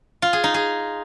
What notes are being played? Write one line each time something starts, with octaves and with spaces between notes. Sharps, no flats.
F4
G#4
D#4
G#4